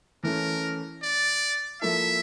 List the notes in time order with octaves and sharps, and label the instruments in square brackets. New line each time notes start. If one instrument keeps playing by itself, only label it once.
[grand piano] E3 A3 C#4 [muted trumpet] A#4
[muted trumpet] D5
[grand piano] F3 A#3 E4 A4 [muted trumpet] E5